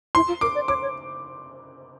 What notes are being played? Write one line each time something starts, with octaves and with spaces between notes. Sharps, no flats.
E4 C6
F4
A#4 D6
D5
C#5 D6
C#5